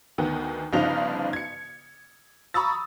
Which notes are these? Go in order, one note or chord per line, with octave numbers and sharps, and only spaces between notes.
D2 D#3 B3
G1 G2 C#3 F3 D#4 F7
G#6 C#7
A#5 B5 C#6 D#6 E6 A6